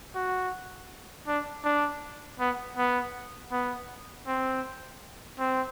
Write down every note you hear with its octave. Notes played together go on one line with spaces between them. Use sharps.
F#4
D4
D4
B3
B3
B3
C4
C4